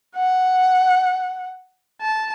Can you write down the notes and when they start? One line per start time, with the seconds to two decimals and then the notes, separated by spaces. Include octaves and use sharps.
0.16 F#5
2.01 A5